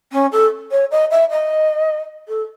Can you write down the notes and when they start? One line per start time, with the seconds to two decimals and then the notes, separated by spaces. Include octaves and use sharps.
0.12 C#4
0.32 A4
0.71 C#5
0.91 D#5
1.10 E5
1.30 D#5
2.28 A4